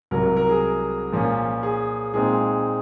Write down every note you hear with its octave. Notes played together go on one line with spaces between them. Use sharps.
C2 C3 F#3 A#4
A#4
A#4
G#4
A#2 F3 A#3 C#4
G#4
A#2 G#3 C4 D#4 G#4